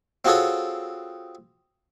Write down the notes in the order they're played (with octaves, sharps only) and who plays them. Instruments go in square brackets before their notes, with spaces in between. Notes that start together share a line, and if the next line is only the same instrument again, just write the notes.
[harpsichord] C4 F4 F#4 G#4 A4 C#5